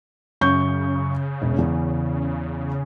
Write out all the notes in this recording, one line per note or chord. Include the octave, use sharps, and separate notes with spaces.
F#2 C#3 C#6 G6
E1
E2